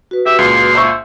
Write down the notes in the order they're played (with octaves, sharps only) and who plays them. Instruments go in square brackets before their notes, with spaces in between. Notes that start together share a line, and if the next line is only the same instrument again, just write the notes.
[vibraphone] F#4 B4
[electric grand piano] G4 [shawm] E5
[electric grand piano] C#2 A#2 [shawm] C6
[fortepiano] C5 E5 C#6 [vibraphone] E6